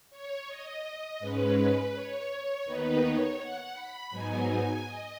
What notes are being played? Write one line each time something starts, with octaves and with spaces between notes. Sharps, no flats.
C#5
D#5
G#2 G#3 C#4 B4
C#5
D#2 D#3 B3 D#4 B4
C#5
F#5
B5
G#2 F#3 B3 D#4 G#5
G#5
D#5